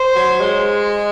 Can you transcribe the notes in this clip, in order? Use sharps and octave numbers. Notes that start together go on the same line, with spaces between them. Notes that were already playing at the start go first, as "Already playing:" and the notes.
Already playing: C5
F#3
G#3